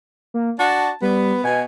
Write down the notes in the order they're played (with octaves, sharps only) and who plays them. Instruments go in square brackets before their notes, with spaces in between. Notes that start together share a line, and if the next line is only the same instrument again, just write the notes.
[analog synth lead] A#3
[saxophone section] D4 F#4 [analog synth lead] A5
[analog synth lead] G3 [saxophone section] B3
[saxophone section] B2 [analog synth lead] G#5